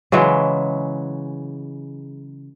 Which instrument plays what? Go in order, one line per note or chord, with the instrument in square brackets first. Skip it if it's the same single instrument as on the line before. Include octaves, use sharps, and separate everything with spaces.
[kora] C#3 E3 F#3 G#3